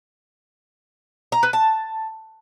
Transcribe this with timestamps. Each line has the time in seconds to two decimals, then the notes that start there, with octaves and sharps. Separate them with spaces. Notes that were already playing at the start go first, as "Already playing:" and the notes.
1.32 A#5
1.43 B4
1.53 A5